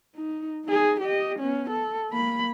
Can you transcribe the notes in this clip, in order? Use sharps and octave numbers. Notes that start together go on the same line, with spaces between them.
D#4
D#4 G#4
G4 D#5
B3 C#4
A4
A#3 B5